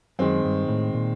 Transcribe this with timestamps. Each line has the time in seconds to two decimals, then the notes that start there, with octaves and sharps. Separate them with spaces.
0.19 F#2 D#3 G#3 C4
0.44 G2
0.69 A2
0.94 A#2